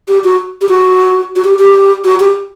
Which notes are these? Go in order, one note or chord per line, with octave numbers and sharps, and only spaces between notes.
G4
F#4
G4
F#4
F#4
G4
G4
F#4
G4